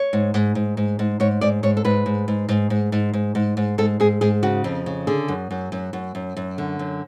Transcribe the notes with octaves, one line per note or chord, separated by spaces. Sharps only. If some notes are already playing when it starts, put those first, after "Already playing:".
Already playing: C#5
G#2
G#2
G#2
G#2
G#2
G#2 C#5
G#2 D5
G#2 C#5
A4
G#2 B4
G#2
G#2
G#2
G#2
G#2
G#2
G#2
G#2
G#2 A4
G#2 G#4
G#2 G#4
C#3 F#4
F2
C#3
D3 G#4
F#2
F#2
F#2
F#2
F#2
F#2
D3
F#2